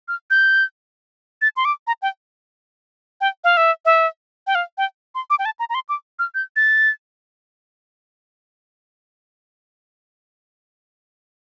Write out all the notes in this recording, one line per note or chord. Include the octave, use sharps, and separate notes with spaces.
F6
G6
A6
C6
D6
A#5
G5
G5
F5
E5
E5
G5
F5
G5
C6
D6
G5
A5
A#5
A#5
C6
D6
F6
G6
A6